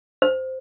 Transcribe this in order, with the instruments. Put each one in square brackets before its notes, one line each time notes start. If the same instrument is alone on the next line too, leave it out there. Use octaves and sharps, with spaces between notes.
[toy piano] C5